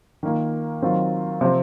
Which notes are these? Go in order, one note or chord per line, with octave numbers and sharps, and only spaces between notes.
D#3 A#3 F4
D#3 F#3 C4 F4
C3 F3 C4